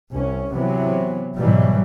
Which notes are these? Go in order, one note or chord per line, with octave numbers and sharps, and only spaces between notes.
C2 C#4
C3 E3 F#3 B3
G#2 B2 E3 F#3 G3